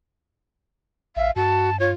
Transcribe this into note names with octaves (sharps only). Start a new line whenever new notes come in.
A1 E5 F5
G2 F#4 A5
F4 C#5